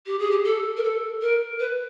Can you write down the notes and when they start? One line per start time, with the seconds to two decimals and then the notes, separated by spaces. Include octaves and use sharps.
0.06 G4
0.19 G#4
0.30 G4
0.44 A4
0.76 A#4
0.83 A4
1.21 A#4
1.59 B4